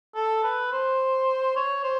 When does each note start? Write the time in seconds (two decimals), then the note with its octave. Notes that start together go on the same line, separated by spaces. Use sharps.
0.15 A4
0.43 B4
0.72 C5
1.56 C#5
1.84 C5